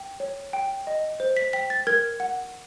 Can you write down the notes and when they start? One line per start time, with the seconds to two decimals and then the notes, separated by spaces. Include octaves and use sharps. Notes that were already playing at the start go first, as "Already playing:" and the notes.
Already playing: G5
0.20 C#5
0.53 G5
0.87 D#5
1.20 C5
1.37 B6
1.53 G5 B6
1.70 A6
1.87 A#4 G#6
2.20 F#5